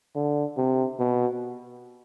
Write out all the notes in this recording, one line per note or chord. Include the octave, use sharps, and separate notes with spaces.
D3
C3
B2